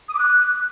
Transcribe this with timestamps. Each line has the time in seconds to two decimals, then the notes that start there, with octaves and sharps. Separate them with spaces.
0.08 D#6
0.13 D6
0.19 F#6